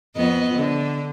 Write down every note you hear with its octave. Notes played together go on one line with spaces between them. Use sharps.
F2 B3 D#5
D3